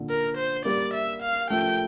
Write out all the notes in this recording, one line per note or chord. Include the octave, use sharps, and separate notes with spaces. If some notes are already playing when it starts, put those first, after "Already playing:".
Already playing: A#2 D3
A#4
C5
G3 A#3 D5
E5
F5
F3 A3 G5